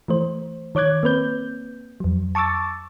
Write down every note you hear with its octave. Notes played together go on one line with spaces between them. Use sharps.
E3 A3 C5
D#3 C#5 D6 F#6 G#6
A#3 C4 B4 G6
F2 F#3
A5 C#6 D6 E6 A6